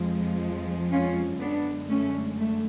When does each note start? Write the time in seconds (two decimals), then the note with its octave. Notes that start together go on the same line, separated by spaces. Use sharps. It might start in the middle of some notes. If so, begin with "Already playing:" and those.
Already playing: F2 F3 G#3
0.91 C#4 F4
1.39 F#2 D3 G#3 B3 D4
1.89 A3 C#4
2.38 A3